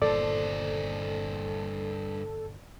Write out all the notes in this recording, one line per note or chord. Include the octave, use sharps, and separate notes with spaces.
G1 G2 A#2 D#3 A4 C5 D5